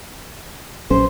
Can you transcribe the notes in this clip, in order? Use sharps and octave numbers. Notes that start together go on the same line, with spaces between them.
A#1 F#3 C#4 C5